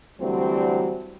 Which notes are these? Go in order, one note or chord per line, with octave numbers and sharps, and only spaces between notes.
D3 E3 F#3 G3 A3 C4